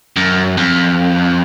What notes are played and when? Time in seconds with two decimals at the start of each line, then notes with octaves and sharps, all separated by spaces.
0.16 F#2
0.57 F2